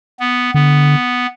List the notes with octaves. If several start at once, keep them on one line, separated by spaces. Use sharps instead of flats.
B3
D3 B3